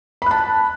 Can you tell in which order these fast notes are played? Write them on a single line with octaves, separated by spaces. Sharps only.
B5 F#6 A5